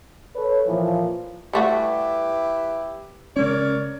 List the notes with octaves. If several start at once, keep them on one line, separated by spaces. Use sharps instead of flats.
A4 B4 C#5
A#2 E3 F3
G3 A3 E4 F#4 G4 B4
C#3 G#3 C#4 A#4 C#5 D5